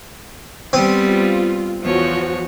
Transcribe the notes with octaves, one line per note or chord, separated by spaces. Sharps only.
G3 B3 C4
F4
E2 F3 F#4 C#5